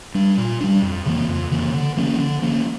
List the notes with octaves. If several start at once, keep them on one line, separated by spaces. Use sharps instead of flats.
G3 D4
A#2
G3 D4
F2
C#3 E3 A#3
F2
C#3 E3 A#3
D3
F3 A#3 C#4
D3
F3 A#3 C#4